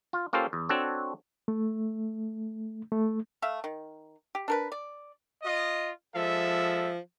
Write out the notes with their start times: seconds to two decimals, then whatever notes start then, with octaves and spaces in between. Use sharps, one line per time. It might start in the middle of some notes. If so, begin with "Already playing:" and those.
0.13 F4
0.33 A#3 C#4 F4 G4 A4 C5
0.53 E2
0.69 C4 D4 F#4 A4 C#5
1.48 A3
2.92 A3
3.42 A3 E5 F5
3.64 D#3
4.35 G4
4.48 D4 A#4 B4
4.72 D5
5.43 F4 D#5
6.15 F3 G#3 A4 E5